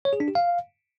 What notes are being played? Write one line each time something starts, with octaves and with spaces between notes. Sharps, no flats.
C#5
G#4
D4
G4
F5